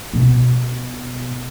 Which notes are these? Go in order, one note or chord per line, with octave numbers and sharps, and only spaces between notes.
B2